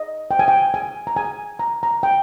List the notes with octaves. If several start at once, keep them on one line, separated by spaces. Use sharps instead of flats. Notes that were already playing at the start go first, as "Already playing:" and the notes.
Already playing: D#5
G5
G#5
G5
G#5
A#5
G#5
A#5
A#5
G5